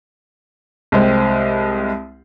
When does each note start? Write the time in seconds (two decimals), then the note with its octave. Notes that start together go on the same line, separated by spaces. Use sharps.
0.92 C2 G#3 C4